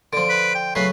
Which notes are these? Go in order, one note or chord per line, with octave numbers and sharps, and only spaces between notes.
D3 F3 D7
B4
G5
C#3 F#3 A3 B4 C7